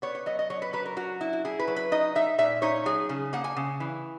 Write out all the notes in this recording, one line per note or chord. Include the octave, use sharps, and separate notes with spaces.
B3 C#5
C#5
F#3 D#5
D#5
F#3 C#5
B4
F#3 B4
A#4
F#3 F#4
E4
F#4
E4 G#4
B4
F#3
B4
D#4 D#5
D#4 E5
A#2 E5
D#4 C#5
F#3 G#4
C#3
A#3 F#5
G#5
C#3
E3